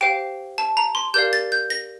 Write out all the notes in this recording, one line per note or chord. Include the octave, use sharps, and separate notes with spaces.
G4 C5 F5 G5
A5
A#5
C6
G4 A#4 D5 F5 G6
A6
G6
A#6